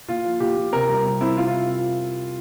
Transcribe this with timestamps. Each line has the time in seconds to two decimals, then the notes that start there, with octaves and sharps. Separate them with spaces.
0.08 A#2 F4
0.25 F3
0.40 A#2 G4
0.57 A#2
0.73 C3 A#4
0.89 G3
1.05 C4
1.21 C4 E4
1.37 C3 F4
1.47 F4